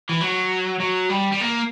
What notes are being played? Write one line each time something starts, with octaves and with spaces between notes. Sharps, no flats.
E3
F#3
F#3
G3
G3
A#3